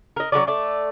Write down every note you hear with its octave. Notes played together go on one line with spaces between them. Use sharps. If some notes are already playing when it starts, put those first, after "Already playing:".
A#4 D#5
F#3 G#3 C#4 D5
A3 D5